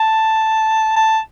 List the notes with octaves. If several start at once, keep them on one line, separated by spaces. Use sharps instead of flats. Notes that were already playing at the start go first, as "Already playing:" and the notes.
Already playing: A5
A5